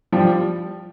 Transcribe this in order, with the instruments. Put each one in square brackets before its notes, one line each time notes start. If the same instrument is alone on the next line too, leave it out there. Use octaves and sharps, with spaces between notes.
[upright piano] F3 G3